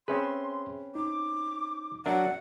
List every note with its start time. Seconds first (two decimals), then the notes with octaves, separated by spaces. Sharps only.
0.08 C4 C#4 G#4 B4 E5 C6
0.95 D#4 D6
2.06 F#3 D4 A#4 E5 F#5